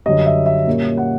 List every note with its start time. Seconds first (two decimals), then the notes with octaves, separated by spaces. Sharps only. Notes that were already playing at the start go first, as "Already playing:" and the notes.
0.06 F#2 D3 G3 D#5
0.26 E5
0.46 E5
0.67 A#2 G3 A#3 C#4
0.97 F#5